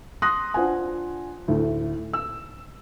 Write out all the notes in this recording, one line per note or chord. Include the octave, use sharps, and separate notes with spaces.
C6 D#6 F#6 A#6
D4 F4 C5 F#5 G#5
D2 A2
E6